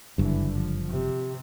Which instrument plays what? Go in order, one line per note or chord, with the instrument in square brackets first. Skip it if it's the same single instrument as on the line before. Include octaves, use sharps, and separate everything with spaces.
[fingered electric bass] F#1 G2 [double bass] D3 E3
[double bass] F3
C3